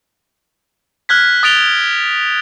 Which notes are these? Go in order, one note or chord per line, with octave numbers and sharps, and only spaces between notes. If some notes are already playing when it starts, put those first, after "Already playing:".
F6 F#6 G#6 B6
D#6 A6 D7 F7 G7